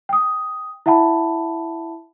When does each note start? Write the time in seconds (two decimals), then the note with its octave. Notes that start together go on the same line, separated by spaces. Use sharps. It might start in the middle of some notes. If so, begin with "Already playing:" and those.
0.09 G5 D#6
0.86 E4 E5 F#5 A5 B5